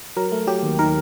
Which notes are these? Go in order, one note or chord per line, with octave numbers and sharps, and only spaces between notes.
F#3 A#4
A3
F#3 G4
D#2
D#3 A#4